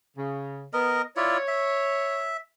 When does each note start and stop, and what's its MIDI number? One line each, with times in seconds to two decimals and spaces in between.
0.17 0.65 49
0.73 1.02 59
0.73 1.02 70
0.73 1.02 75
1.17 1.38 64
1.17 1.38 65
1.17 2.35 73
1.17 1.38 74
1.48 2.37 76